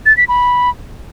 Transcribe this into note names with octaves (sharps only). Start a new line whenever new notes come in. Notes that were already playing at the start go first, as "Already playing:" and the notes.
A6
B6
B5